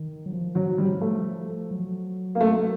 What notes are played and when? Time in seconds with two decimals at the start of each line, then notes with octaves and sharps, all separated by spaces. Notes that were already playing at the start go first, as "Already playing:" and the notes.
Already playing: D#3
0.26 F#3
0.33 F3
0.55 F#3
0.78 G3
1.01 A3
1.71 F#3
2.35 A#3
2.41 A3